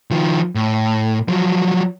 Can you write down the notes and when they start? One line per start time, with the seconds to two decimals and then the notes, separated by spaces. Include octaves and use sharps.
0.11 D#3 F3
0.55 A2
1.28 F3 F#3